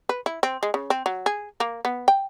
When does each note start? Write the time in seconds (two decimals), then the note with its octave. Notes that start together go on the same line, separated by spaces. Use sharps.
0.09 B4
0.26 E4
0.43 C4
0.63 G#3
0.74 C#3
0.90 C4
1.06 F#3
1.26 G#4
1.60 A#3
1.85 B3
2.08 G5